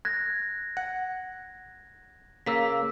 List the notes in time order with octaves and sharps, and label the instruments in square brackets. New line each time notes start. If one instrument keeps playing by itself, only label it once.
[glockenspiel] F#6 G#6 A#6
[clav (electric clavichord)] F#5
[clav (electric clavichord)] C#3 A#3 [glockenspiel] E6 B6